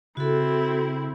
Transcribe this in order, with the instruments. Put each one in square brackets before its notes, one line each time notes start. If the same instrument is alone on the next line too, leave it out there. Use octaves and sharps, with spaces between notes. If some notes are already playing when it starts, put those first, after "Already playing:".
[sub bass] C#3 [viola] C4 E4 [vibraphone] F#4 A4